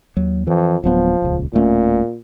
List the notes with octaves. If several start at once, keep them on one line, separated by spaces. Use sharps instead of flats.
D#2 F#3
F2 E3
D1 F3 F#3 B3
D#1 C#2
D1 A#2 A3 C#4